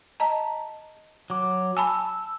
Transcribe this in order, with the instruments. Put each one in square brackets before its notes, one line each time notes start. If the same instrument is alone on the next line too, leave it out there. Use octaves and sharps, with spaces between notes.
[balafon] D#5 A5 A#5
[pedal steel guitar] F#3 D6
[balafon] G#5 A5 B5 [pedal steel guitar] E6